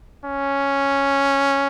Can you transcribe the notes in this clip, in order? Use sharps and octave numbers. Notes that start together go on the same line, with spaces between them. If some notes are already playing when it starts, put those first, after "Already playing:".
C#4